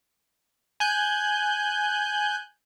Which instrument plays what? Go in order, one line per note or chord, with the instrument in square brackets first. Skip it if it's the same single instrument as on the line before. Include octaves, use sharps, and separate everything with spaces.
[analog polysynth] G#5 F#6 G6